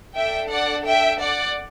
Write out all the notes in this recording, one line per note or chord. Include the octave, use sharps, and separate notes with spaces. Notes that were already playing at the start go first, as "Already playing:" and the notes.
D4 A4 E5 G5
D5 F#5
E5 G5
D5 F#5